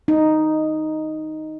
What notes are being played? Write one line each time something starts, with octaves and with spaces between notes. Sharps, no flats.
D#4